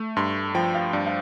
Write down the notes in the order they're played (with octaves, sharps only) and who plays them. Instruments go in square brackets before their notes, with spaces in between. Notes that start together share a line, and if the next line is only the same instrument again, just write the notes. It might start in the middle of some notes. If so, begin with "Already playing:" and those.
Already playing: [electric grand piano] A3
[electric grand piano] G2 [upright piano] C6
[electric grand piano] F3 [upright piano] G5
[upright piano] F5
[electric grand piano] G2 [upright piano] D5
[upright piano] F5